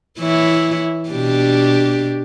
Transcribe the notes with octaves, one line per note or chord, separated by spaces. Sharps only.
E3 E4 C#5
B2 D4 G4